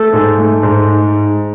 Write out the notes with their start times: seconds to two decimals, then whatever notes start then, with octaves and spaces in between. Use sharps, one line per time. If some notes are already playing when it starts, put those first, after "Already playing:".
Already playing: A3 A4
0.13 G#2
0.38 A3
0.63 G#2